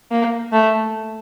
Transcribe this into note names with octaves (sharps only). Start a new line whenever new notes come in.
A#3
A3